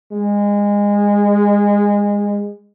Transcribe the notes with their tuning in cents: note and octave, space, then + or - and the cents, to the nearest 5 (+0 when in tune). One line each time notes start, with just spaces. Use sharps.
G#3 -25